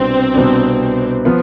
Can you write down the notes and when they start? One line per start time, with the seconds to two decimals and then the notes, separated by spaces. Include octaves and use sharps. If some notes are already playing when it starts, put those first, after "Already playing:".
Already playing: C2 B2 B3 C4 D4
0.34 C2 B2 B3 D4
1.25 F3 B3 F4